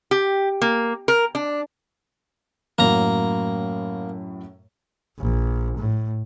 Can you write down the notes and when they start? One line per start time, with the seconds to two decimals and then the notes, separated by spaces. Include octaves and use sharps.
0.11 G4
0.62 A#3
1.08 A#4
1.35 D4
2.78 F#2 A2 F#3 A#3 A#5
5.19 A#1
5.78 A2